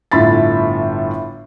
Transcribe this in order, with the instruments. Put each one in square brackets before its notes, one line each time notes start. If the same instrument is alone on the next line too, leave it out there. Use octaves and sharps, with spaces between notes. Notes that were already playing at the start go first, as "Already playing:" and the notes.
[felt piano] G1 A2 F4 B5 A6